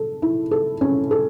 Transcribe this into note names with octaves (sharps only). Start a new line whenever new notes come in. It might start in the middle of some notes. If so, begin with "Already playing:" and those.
Already playing: A4
E4
A4
C#4
A4